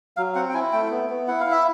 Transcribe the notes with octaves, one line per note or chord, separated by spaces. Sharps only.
F#3 F5
C4 F#5
G5
E4 G#5
A3 G5
B3
B3
E4 F#5
F5
E4
E5